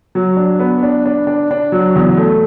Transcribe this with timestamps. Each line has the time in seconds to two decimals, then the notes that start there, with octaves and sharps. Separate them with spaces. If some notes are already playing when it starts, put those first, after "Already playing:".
0.15 F#3
0.37 D4
0.59 B3
0.83 D4
1.06 D4
1.27 D4
1.51 D4
1.72 F#3
1.96 E2
2.17 A3